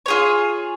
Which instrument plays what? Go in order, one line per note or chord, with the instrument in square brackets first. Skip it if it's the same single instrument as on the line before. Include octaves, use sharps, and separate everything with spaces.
[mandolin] F4 G#4 C#5